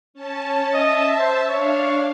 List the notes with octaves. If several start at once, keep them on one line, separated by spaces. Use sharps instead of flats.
C#4 A5
D#5 E5 A5
C5
D4 C#5 F5